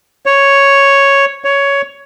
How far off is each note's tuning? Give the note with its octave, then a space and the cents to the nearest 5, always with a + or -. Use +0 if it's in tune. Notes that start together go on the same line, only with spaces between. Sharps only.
C#5 +0
C#5 +10